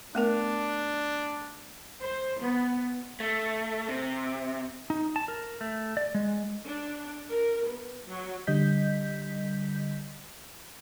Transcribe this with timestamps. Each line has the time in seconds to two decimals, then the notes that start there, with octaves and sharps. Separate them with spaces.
0.15 A3 B3 D4 A#4
2.01 C5
2.41 B3
3.20 A3
3.89 C3
4.90 D#4
5.16 A5
5.28 A#4
5.61 A3
5.97 D5
6.15 G#3
6.66 D4
7.30 A#4
7.66 B3
8.06 F#3
8.47 D3 G3 D#5 G6 B6